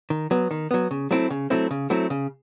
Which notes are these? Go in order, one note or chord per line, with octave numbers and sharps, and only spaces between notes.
D#3
F#3 B3
D#3
F#3 B3
C#3
F#3 A3 C4 E4
C#3
F#3 A3 C4 E4
C#3
F#3 A3 C4 E4
C#3